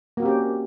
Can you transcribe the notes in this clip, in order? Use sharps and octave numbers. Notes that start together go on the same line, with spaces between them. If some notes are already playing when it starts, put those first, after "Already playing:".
A#3 C4 C#4 F#4 G4